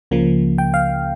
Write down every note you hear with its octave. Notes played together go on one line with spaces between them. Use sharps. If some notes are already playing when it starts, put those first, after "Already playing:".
C#2 C#3 F3 A#3
G5
F5